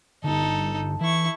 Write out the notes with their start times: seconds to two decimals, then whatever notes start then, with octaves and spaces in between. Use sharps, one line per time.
0.24 G1 D3 D#4 A4
1.01 E3 E4 C#6